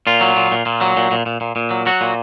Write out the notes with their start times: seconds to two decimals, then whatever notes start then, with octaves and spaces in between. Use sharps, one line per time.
0.07 A#2 F4
0.21 F#3
0.36 A#2
0.51 A#2
0.66 A#2
0.81 F#3
0.97 A#2
1.11 A#2
1.26 A#2
1.41 A#2
1.56 A#2
1.71 F#3
1.86 F#3 F#4
2.01 A#2